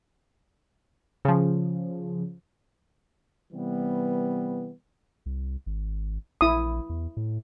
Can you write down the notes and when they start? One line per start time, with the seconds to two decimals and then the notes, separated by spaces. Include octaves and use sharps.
1.25 C#3 F3
3.53 C3 E3 G3 B3
5.26 C2
5.66 G#1
6.41 A#1 E4 D#6
6.89 E2
7.17 A2